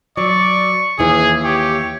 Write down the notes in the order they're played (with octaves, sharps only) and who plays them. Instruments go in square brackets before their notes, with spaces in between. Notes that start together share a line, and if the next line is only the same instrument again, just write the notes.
[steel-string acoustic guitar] F#3 [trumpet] D5 [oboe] C#6
[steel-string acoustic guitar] D#2 E3 [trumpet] G#4
[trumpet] G4 [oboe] C#5